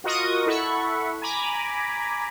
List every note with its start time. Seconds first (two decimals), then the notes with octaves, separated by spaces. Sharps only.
0.04 F4 F#4 A#4 D#5 C#6 D#6
0.46 E4 A4 F#5 B5 C#6
1.22 G#5 A#5 B5 D6